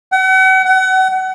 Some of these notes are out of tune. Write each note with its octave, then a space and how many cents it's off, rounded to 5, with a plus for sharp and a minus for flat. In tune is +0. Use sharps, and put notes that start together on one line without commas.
F#5 +40
F#5 +30